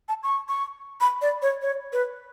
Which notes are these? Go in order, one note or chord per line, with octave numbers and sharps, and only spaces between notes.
A5
C#6
C#6
B5
D5
C#5
C#5
B4